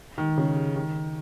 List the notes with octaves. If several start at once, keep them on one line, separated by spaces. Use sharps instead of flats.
D#3
C#3
D#3